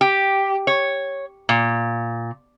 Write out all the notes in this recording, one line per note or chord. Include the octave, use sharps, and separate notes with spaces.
G4
C#5
A#2